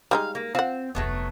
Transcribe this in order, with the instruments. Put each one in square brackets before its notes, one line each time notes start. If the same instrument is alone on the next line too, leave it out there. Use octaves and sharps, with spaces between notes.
[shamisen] G3 G#3 D#4 [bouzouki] F5
[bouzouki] A#3
[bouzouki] C4 [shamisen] F4 F#5
[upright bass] F1 D2 [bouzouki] F#3 A3 B3